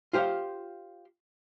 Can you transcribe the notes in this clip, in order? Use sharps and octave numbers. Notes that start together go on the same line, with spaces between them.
F4 G4 C5 F5